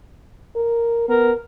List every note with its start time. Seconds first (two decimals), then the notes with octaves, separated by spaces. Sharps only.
0.56 A#4
1.09 B3 A#4